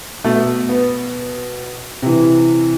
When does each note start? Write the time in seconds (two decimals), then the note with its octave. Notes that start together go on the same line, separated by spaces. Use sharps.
0.24 B2 A3
0.69 B3
2.02 C3 E3